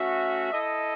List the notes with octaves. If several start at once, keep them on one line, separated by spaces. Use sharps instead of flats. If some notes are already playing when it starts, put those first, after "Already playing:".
Already playing: A3 C#4 F#4 E5
E4 A4 D#5